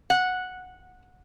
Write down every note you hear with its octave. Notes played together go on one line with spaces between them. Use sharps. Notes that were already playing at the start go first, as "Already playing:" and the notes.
F#5